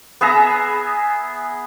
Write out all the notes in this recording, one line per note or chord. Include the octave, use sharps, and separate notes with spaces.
B3 G#4 E5 A#5